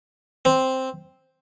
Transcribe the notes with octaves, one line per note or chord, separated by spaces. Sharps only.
C4